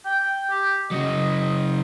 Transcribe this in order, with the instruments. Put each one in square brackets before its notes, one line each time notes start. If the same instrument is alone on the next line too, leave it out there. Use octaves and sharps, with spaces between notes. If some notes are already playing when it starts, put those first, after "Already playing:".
[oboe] G5
G4
[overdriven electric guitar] C#3 F#3 [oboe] D#5